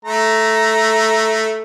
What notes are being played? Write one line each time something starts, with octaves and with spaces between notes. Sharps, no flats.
A3 A#5